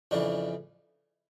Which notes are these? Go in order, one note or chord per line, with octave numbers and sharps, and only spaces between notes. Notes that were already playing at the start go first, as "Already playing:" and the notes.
F2 C#3 E3 D4